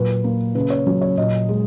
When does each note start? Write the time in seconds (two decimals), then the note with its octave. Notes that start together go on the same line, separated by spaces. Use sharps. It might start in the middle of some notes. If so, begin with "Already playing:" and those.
Already playing: A#2 F#3 B4
0.24 A#3
0.55 C#3 B4
0.70 C#5
0.87 F#3
1.02 C#5
1.17 A#2 D#5
1.49 G#3